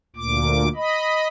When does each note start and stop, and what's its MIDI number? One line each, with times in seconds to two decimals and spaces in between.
0.16 0.68 38
0.16 0.68 46
0.16 0.68 86
0.76 1.28 75
0.76 1.28 83